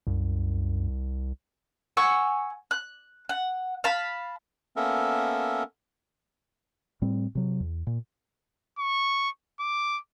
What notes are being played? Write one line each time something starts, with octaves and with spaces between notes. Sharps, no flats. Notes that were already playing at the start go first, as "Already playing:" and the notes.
C2 F#2
F#5 G#5 C#6 E6
F#6
F#5
F5 A5 B5
A#3 B3 C#4 A4 A#4 E5
A2 G3 C4
C3 F#3
E2
A#2
C#6
D6